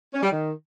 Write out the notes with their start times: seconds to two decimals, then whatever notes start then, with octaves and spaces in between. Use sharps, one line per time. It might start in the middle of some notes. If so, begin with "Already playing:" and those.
0.14 C#4
0.23 G3
0.31 D#3